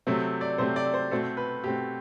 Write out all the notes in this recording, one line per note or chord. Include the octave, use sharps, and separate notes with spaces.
C3 F#3 A3 C4
D5
C3 F#3 A3 C4 C5
D5
C5
B2 A3 C4 A4
B4
B2 A3 C4 G4